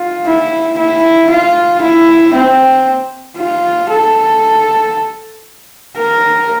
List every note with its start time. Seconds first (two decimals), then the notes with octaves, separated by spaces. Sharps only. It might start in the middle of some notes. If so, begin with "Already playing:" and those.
Already playing: F4
0.26 E4
0.78 E4
1.30 F4
1.81 E4
2.34 C4
3.37 F4
3.89 A4
5.97 A#4